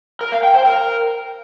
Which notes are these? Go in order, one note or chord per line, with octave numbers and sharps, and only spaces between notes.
A#4
F5
G5
C5
A#4